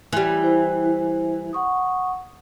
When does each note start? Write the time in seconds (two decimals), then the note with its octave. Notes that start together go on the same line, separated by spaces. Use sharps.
0.13 E3 G3
0.43 E4 C5
1.53 F#5 C#6 D#6